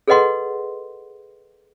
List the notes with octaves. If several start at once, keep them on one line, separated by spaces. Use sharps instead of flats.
G#4 A4 B4 D#5 F#5 C6